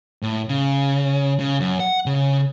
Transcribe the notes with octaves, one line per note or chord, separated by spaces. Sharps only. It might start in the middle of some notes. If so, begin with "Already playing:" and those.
A2
C#3
C#3
F#2
F#5
C#3